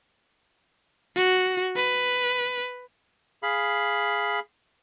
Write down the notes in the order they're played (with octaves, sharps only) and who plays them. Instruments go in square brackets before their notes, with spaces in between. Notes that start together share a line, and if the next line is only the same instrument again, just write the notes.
[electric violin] F#4
B4
[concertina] G#4 F5 B5